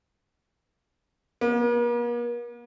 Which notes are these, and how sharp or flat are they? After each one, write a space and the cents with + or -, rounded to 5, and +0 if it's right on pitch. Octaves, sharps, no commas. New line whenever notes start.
A#3 +45